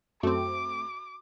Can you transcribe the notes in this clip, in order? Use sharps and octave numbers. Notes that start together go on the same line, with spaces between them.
F#2 A3 C4 F#4 D6